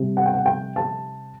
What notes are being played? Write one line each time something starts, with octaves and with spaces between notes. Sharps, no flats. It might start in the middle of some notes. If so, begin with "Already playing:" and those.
Already playing: C3 G3 C4
F#5
G5
F#5
G5
A5